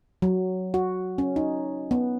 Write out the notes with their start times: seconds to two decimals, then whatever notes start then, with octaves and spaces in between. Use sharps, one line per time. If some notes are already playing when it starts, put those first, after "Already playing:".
0.22 F#3
0.74 F#4
1.18 C#4
1.36 D#4
1.91 B3